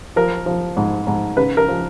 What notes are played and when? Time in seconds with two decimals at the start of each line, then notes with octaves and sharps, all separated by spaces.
0.16 F3 A#4
0.46 F3
0.77 G#2
1.07 G#2
1.37 C#3 B4
1.57 A#4
1.68 F3